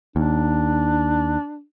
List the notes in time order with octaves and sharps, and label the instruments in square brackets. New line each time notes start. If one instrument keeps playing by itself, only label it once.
[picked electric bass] D#2 [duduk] D4